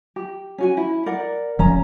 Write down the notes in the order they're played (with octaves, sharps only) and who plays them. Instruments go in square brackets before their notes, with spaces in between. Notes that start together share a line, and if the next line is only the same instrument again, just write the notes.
[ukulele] G4
C#4 F#4 G#5
E4
A#4 D5 F#5
[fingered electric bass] F1 F3 [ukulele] C#4 A#5